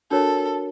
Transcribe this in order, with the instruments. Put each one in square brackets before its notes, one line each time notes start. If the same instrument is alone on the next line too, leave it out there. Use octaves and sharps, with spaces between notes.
[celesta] D4 F#4 A#4 C#5 [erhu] A4